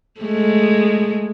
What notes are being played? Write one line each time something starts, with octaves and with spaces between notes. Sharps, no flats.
G#3 A3